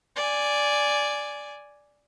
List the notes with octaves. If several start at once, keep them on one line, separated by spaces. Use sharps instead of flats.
D5 G#5